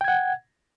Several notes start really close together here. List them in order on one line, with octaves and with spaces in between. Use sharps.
G5 G#6 F#5